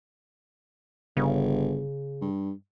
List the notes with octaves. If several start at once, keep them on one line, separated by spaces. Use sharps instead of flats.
G1 C#3
G2